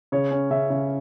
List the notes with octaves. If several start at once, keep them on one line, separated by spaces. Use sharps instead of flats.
C#3 C#5
C#4
C#3 E5
C#3